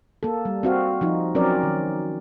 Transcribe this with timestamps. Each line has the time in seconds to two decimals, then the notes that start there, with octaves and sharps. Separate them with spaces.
0.23 A#3 A4
0.45 G3
0.63 C4 F#4 F5
1.01 F3 D#4 F4
1.35 F#3 C4 C#4 A#4 D5
1.63 D#3